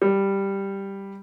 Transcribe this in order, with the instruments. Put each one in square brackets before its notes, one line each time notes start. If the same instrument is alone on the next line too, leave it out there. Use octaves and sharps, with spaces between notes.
[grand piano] G3